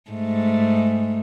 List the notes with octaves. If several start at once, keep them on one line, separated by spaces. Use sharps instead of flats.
G#2 A3